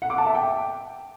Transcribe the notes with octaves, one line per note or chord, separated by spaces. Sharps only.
F#5
D6
A5
E5
G5